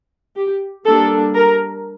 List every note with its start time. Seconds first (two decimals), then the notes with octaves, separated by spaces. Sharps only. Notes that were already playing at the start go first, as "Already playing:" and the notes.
0.36 G4
0.85 G3 A#3 D4 A4
1.34 A#4